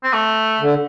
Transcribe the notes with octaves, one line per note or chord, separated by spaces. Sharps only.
C4
A3
D3